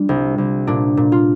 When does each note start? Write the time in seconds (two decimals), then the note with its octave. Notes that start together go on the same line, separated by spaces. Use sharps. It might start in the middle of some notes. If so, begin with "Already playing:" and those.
Already playing: G3 D4 F4
0.09 C2
0.38 C2
0.67 A#2 D4
0.97 A#2
1.12 F4